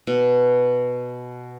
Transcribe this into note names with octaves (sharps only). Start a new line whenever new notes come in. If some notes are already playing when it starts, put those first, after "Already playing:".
B2